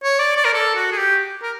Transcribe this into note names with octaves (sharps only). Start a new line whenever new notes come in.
C#5
D5
D5
A#4
A4
F#4
G#4
G4
A#4